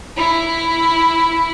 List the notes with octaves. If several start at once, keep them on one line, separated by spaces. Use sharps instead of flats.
E4